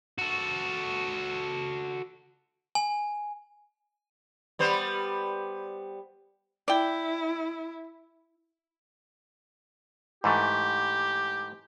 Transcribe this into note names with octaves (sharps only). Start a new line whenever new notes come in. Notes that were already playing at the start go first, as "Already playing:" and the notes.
F#4 A4
G#5
G3 B3 C5
E4 D5 G5
G#2 E3 A3 G4